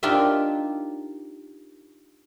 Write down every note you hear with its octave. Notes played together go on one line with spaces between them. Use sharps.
D4 D#4 F4 G4 A#4 E5